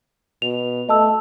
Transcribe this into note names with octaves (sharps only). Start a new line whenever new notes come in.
B2 F7
A3 D#5 A5 E6